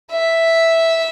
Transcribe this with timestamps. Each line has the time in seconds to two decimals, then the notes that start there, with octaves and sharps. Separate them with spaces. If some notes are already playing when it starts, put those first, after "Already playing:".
0.12 E5